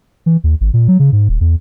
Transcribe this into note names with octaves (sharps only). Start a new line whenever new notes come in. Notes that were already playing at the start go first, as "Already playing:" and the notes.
E3
D#2
G#1
A#2
F#3
C#3
G#2
D#1
E2